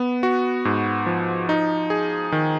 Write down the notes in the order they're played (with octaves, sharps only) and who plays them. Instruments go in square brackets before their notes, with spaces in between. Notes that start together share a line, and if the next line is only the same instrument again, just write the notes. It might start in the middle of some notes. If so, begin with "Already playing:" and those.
Already playing: [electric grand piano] B3
F#4
G#2
F3
D#4
G#4
D#3